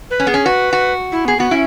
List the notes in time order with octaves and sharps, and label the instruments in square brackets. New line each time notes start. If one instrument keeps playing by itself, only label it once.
[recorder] B4
[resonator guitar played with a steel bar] C#4
[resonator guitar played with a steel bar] B3 [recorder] G#4
[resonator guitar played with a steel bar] C#4
[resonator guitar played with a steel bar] F#4 [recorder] B4
[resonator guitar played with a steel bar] F#4
[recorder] E4
[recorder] B3 [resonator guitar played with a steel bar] G#4
[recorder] B3 [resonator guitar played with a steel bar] F#4
[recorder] C#4 [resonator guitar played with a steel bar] E4